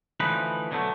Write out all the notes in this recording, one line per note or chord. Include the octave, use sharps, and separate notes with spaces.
D2 E3 F3 D#4 B4
B2 D3 F#3 A3